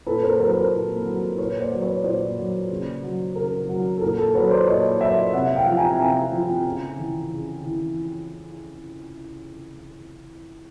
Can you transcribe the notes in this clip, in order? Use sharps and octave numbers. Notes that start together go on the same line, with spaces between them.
A#2 A4 B4
A#4 C5
F#3 A#4 C5
B4
A#4 C5
A#2
F#3
A#2 B4 C#5
C5 D5
F#3
B4 C#5
A#2 C5 D5
F#3
C#3
F#3
C#3 A#4
F#3
A4
A#2 A#4
A4
F#3 B4 C#5
C5 D5
A#2 C#5 D#5
F#3 D5 E5
C3 E5 F#5
F5 G5
F3
G#5 A#5
C3 G#5 A#5
F3
C#3
E3
C#3
E3